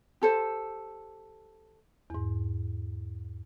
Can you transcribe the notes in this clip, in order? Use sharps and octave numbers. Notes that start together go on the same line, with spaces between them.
G4 A4 C5
E2 G#2